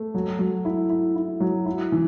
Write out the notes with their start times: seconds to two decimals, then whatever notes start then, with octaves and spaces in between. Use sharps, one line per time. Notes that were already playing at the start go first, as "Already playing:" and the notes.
Already playing: A3
0.14 F#3
0.39 F#3
0.65 E4
0.90 E4
1.16 E4
1.40 F#3
1.66 E4
1.92 E3